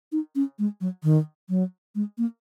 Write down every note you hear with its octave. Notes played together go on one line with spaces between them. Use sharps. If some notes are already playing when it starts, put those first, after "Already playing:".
D#4
C#4
G#3
F#3
D#3
F#3
G#3
A#3